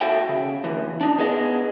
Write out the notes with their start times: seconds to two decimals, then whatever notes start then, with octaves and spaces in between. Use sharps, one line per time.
0.01 F#4 A4 E5 G5
0.29 C#3
0.64 D2 E3
1.01 D4 D#4
1.18 B3 G#4 D#5